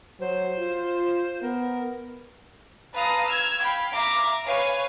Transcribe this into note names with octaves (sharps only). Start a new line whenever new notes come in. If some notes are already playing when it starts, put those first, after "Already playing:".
F#3 C5
F4
B3 A#4
B4 F5 A5 A#5 D#6
E6 F6 G#6
F5 G5 B5
E5 F5 A#5 D6
B4 C#5 F5 G#5